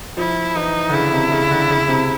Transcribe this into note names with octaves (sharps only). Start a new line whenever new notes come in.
F3 E4
E3 D#4
D3
C#3 E4
C3
C#3
D3
C#3
C3